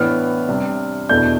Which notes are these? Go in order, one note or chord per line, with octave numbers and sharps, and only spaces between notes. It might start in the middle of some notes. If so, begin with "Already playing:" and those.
Already playing: A2 E3 B3 D4 F6
C3 G3 D4
E2 B2 A3 D4 G6